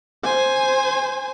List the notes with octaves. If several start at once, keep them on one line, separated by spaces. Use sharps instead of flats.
C5 G#5